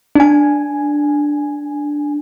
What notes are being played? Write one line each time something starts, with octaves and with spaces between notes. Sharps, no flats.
D4 G#5